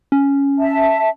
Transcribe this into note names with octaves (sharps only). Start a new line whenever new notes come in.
C#4
E5 A5